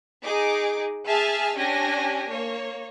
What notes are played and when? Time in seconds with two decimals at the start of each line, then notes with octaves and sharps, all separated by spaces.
0.23 D#4 G#4 D6
1.07 G#4 E5 G#5 A5 F6
1.56 C#4 D4 G4 G#5 A#6
2.27 A#3 C#5